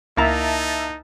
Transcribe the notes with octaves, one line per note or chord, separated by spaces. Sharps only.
C#2 A#3 D#4 E4 E5 A5 A#5